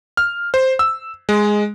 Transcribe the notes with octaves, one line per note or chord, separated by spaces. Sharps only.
F6
C5
E6
G#3